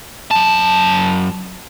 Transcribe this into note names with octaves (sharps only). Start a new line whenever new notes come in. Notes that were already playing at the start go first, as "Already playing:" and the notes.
F#2 A5